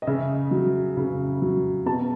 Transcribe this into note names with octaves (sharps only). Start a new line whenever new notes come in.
D#5
C#3 E5
F#3
C#3
F#3
B2 A5